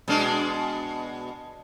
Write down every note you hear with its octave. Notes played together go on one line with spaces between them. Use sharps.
B2 G#3 D4